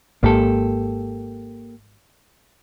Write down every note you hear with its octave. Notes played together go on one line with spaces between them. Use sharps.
G#1 G#2 A#3 G4 A4